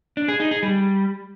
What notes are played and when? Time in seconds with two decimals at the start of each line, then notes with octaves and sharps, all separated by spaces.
0.17 D4
0.28 G#4
0.40 D#4
0.51 G#4
0.63 G3